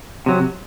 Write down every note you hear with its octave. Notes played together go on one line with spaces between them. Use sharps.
C3 F#3